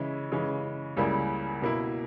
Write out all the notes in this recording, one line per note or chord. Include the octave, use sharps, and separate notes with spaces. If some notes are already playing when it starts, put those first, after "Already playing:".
Already playing: C#3 E3 G#3 C#4 E4
C#3 E3 G#3 C#4
C#2 C#3 G3 A#3 E4
B2 A#3 E4